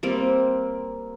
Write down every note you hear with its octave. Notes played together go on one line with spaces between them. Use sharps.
G3 A#3 C4